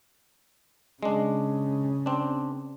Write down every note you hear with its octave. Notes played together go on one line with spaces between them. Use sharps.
C#3 G#3 D4
C4 D4